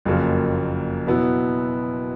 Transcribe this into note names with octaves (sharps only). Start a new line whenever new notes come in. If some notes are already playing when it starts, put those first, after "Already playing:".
F#1 F2 C#3 F#3 A#3
B2 F#3 B3 E4